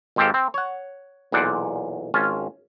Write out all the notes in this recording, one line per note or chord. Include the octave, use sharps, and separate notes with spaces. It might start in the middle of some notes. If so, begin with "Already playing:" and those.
G#1 G#2 C4 G4 A4 F5
C4
C#5 F#5
B1 E2 A#2 C5 D5 F#5
G#1 C#4 F4 A5